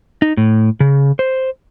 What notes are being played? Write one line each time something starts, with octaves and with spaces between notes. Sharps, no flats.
D#4
A2
C#3
C5